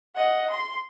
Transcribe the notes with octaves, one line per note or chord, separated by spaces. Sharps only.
D#5 F#5
C6